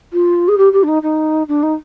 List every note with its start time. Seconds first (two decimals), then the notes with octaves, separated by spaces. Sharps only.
0.13 F4
0.48 G#4
0.58 G4
0.73 G4
0.83 D4
0.88 D#4
1.03 D#4
1.48 D4
1.63 D#4